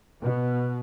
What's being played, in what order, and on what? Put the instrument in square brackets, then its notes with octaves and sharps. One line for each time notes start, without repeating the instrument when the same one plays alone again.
[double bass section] B2